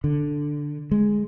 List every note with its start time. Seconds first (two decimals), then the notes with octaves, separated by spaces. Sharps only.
0.04 D3
0.91 G#3